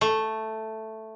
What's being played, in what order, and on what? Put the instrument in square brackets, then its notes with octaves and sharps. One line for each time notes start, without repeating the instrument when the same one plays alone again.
[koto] A3